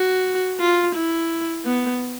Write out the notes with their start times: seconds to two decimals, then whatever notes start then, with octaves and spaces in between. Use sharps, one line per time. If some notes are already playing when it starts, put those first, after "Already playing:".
Already playing: F#4
0.60 F4
0.95 E4
1.65 B3